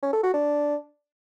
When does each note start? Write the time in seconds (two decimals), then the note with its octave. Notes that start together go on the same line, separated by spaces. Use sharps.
0.02 C#4
0.13 A4
0.23 F#4
0.34 D4